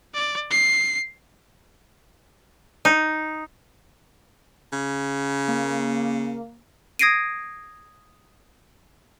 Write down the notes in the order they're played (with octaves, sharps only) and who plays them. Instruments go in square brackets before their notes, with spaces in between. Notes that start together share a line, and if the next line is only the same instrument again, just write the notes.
[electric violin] D5
C7
[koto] D#4
[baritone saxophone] C#3
[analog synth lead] A#3
[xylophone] D#6 G#6 A#6 C7 D7 D#7